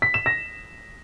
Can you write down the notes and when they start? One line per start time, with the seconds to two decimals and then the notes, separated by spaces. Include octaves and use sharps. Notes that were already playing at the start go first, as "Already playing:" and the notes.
0.02 B6
0.14 E7
0.26 A#6